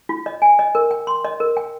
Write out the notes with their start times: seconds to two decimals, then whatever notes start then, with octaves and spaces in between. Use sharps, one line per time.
0.09 F4
0.26 D#5
0.42 G#5
0.59 D#5
0.75 A#4
0.91 G5
1.07 C6
1.25 D#5
1.40 A#4
1.57 G5